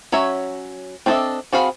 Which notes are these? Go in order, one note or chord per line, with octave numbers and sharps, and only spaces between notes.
F#3 C#4 C#5 E5
C4 D4 A4 D#5 E5
C4 F#4 G#4 F5 B5